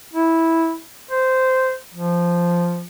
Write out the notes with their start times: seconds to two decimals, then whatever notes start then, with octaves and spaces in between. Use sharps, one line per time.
0.13 E4
1.11 C5
1.94 F3